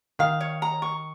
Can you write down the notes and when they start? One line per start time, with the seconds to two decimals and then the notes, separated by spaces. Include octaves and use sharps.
0.19 D#3 F5
0.41 C#5
0.62 A#5
0.82 C#6